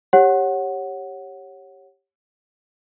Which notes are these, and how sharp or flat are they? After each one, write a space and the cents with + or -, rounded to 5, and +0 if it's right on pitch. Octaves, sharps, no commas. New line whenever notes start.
G4 +0 C#5 -15 F#5 +0